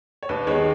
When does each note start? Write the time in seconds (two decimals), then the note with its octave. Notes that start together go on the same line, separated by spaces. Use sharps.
0.23 C#5
0.29 D#2 B4
0.47 D#3 G#3 B3 C#5